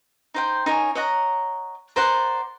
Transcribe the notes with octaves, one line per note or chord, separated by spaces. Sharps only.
D#4 C5 G5
D#4 A#4 C#5 G#5
C#5 D#5 F#5 A#5
A#4 C5 D5 F#5